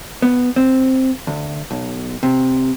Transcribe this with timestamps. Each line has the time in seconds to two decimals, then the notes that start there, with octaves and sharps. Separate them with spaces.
0.22 B3
0.56 C4
1.27 D2
1.70 B1
2.23 C3